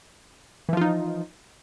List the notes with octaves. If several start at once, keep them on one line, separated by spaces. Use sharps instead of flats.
E3 F3 D#4 F4